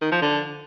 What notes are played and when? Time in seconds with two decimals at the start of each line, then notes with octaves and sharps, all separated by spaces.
0.01 D#3
0.11 F3
0.22 D3